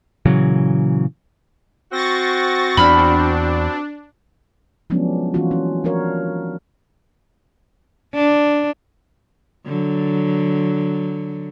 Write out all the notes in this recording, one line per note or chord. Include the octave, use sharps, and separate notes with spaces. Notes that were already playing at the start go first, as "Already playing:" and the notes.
A#2 C#3 E3 F#3
C4 F#4 C#6 A6 A#6
E2 D4 B5 F6
F3 F#3 G#3 B3 C#4 D4
E3 A#3 C#4 F4 F#4
C#4
F3 D4 F#4 A#4 C#5 F5
D4
D3 F#3